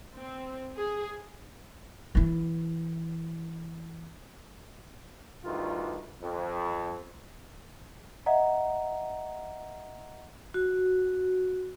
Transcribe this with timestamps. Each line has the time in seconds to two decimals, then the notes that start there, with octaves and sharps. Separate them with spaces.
0.18 C4
0.77 G#4
2.15 E3 E4
5.44 D2 G2 D#3 F4
6.21 F2
8.26 D#5 E5 F#5 A#5
10.54 F#4